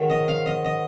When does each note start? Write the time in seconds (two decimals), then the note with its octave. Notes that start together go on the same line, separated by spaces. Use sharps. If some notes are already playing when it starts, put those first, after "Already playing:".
Already playing: G#2 D#3 F#3
0.10 D#5
0.28 F5
0.46 D#5
0.65 D#5